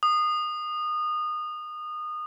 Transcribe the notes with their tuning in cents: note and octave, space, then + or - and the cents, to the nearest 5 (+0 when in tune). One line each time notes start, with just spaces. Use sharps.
D#6 -25